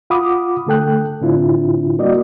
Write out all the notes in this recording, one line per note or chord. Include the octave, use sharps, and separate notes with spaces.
F4 F5 F#5 B5 D6 D#6
D3 A3 A4 G5 F#6
A2 D3 C4 D4 E4 F4
G3 A#3 F#4 D5 D#5